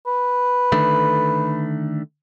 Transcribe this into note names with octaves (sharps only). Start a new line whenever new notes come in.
B4
D3 D#3 A3